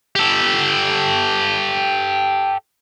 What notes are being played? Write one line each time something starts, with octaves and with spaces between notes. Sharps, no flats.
G4 A4